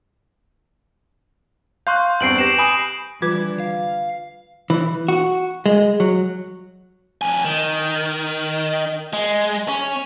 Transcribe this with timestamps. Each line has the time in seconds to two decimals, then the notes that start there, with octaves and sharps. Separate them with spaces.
1.87 F5 C6 C#6 F#6 G6
2.20 E2 G2 C4 C7 D7 F#7
2.38 G4 B4 A#6 C7 E7
2.58 G#5 B5 D#6
3.22 D3 E3 G3 F4 B4 D6 G#6
3.60 F5
4.70 E3
5.08 F#4
5.66 G#3
6.00 F#3
7.22 F2 G#5
7.45 D#3
9.13 G#3
9.68 C#4